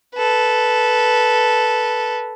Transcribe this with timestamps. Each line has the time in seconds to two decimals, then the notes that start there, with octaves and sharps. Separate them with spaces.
0.15 A4 B4